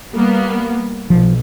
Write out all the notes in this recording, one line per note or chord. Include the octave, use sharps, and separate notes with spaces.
G3 A#3 B3
B1 F3